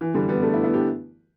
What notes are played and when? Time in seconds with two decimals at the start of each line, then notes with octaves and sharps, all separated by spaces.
0.01 E3
0.14 D3 G3
0.29 G3 B3
0.42 A3 D4
0.53 B3 E4
0.64 B3 E4
0.74 D4 G4